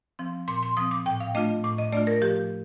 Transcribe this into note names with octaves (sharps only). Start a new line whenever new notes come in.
F3 C4
A#2 C6
C6
F3 C4 D#6
D6
A2 G5
F5
A3 D4 F4 D#5
A2 D6
D#5
A3 D4 F4 D5
A#4
F3 G4